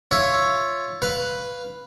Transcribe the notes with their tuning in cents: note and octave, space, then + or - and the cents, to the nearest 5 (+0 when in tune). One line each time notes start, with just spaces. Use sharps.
F4 +0 C#5 +0 E5 +10
B4 +0 F5 +0